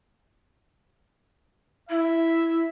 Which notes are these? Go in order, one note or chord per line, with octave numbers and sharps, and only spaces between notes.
E4 E5